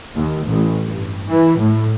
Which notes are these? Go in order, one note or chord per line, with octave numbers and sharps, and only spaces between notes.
D#2
A1
G2
E3
A2